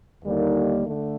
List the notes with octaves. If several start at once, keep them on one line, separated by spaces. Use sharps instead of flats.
D#2 D3 G3 A#3 D#4
D3 A3